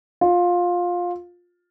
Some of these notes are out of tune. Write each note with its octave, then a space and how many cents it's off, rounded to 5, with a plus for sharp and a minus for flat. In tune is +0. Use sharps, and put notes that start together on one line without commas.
F4 +15